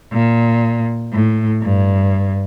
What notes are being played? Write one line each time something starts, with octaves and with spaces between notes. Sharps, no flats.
A#2
A2
G2